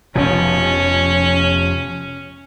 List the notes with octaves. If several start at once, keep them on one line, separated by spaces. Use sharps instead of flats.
F1 B2 F3 C#4